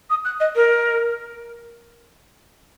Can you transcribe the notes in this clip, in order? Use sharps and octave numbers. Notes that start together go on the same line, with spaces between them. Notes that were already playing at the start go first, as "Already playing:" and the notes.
D#6
F#6
D#5
A#4